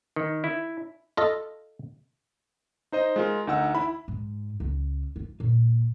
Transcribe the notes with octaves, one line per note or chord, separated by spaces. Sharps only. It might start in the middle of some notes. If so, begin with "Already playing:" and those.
D#3
E4
F4 A4 D#5
D#4 C5 D#5
G#3 F4 A#4
D2 D#4 F#5 E6
E4 B5
G#2
C#2
F4
A#1